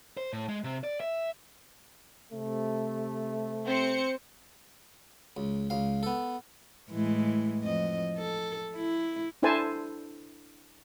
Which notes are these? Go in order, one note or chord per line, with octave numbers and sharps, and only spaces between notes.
C5
A2
G#3
C3
D5
E5
C3 A3
C4 C5 C#7
C#2
C#2 F5
B3 A4
A2 E3 G#3
F2 D#5
A4
E4
D4 E4 A4 C5 G#5 A5